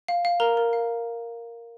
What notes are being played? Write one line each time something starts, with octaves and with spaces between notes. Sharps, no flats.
F5
F5
A#4 A#5
A#4
F5